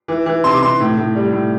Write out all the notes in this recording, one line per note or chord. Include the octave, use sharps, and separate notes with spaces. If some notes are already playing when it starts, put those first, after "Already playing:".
E3
E3
C3 C6
D6
C3 C6
A2
A2
G3
A2